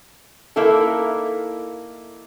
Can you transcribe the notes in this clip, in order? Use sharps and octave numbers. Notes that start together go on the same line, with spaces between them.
A#3 D#4 E4 A4